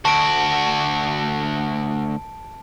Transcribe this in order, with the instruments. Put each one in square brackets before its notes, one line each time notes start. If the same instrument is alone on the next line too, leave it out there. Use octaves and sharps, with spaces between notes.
[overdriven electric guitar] D2 F#4 [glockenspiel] A5 D7